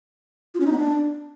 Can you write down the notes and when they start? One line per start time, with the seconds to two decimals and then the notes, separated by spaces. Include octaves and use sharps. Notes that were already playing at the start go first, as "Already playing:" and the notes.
0.54 F4
0.60 C#4
0.66 D#4
0.72 B3
0.78 D4